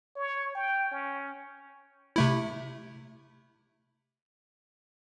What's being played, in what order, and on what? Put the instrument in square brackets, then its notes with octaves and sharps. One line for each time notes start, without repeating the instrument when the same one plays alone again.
[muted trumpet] C#5
G5
C#4
[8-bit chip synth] C3 A3 E4